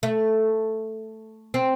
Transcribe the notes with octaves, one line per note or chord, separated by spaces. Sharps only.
A3
C4